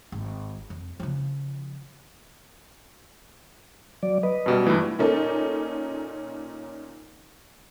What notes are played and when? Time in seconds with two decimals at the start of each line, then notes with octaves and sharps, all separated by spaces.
0.12 G#1
0.70 F2
1.00 C#3 F3
4.03 F#3 D5
4.23 B4 D#5
4.46 F#2 B2 G3
4.67 G2 E3 A3 F4
4.99 A#2 A#3 C#4 D#4 A4